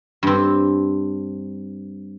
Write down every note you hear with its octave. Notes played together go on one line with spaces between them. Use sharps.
G2 C4